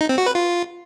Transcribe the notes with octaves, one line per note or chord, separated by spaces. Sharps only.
D#4
C4
F#4
B4
F4